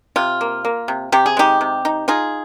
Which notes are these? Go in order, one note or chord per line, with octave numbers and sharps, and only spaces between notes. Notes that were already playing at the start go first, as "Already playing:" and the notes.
C3 F4
A#3
A#3
C3
C3 G4
G#4
G#3 D#4 G4
C3
D#4
D#4 F4 G#4